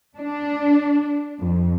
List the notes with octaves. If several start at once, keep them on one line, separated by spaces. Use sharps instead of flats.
D4
F2